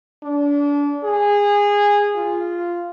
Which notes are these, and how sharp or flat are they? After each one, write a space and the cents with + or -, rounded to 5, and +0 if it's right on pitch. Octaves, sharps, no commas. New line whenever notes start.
D4 -30
G#4 -20
F4 -10